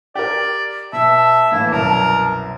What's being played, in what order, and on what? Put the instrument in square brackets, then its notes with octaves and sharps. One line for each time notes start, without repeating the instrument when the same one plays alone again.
[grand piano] G4 A#4 [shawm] D5
[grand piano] B2 [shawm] E5 [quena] A5
[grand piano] A2 E3 A#3 [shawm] E4
[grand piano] C2 F#2 B2 [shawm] A#4